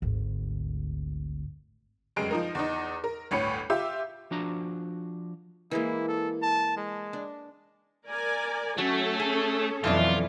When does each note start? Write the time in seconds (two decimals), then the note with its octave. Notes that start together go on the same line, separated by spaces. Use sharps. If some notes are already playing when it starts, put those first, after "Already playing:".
0.02 G#1 D2
2.16 F1 F#2 G#3 D7
2.31 F3 D#4 A#4
2.55 E2 D#4
3.04 A#4
3.31 G1 D2 A2 C#5 C#7
3.70 F4 G4 E5
4.31 F3 D4 F#4 A#5
5.71 E3 G#3 A#3 E4
6.08 A4
6.42 A5
6.77 G#3
7.13 D4
8.06 A#4 D5 G#5
8.78 F#3 A3 C#4 A4
9.20 G#4
9.84 F2 B2 E3 F#3 E4 F4 D5